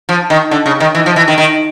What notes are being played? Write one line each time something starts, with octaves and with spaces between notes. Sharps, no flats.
F3
D#3
D3
C#3
D#3
E3
F3
E3
D#3
D#3